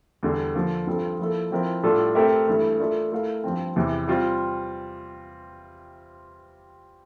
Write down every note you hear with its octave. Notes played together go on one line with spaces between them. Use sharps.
E2 D3 G3
D3 F3 A#3
G2 F3 C4 F4 A4
F3 A#3 E4 A4
F3 C4 E4 A#4
A2 G3 D4 F4 A4
A3 C4 G4 A#4 E5
G2 E3 A3
A3 D4 F4 A#4 E5
A3 E4 A#4 F5
G2 F3 C4
E2 C3 E3
G3 C4 F4